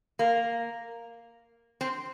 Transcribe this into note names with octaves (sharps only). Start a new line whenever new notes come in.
A#3
C4